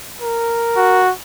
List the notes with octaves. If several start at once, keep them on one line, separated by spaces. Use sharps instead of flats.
A#4
F#4